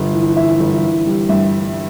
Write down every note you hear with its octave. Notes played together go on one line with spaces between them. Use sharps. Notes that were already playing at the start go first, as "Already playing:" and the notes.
Already playing: G1
E3
E3 E5
G1
E3
G3
G2 E5